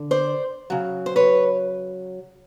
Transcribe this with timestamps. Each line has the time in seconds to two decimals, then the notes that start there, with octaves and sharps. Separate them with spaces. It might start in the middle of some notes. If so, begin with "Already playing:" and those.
Already playing: D3
0.11 C5 D5
0.70 C#3 F#3
1.06 C5
1.16 B4 C#5